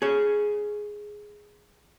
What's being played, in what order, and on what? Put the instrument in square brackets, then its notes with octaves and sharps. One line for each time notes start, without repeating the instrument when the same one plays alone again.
[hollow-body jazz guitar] G#4 C#5